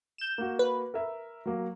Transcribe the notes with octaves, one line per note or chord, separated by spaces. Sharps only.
G6 E7
A#3 F#4
B4
A#4 E5
F#3 A#3